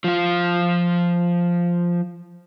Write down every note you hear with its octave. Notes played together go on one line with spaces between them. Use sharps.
F3 F4